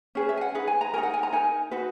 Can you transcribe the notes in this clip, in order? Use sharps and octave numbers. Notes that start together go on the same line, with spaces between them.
C#4 G#4 B4
E5
G#5
F#5
D#4 G#4 B4
G#5
A#5
D#4 F#4 A#4 G#5
F#5
G#5
A#5
D#4 A#4 G#5
D#4 F#4 B4